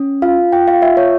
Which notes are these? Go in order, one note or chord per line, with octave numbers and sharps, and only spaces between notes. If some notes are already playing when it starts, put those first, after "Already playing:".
Already playing: C#4
F4 F5
F4 G5
F5
F4 E5
C#5